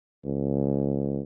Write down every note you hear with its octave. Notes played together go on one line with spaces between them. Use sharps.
C#2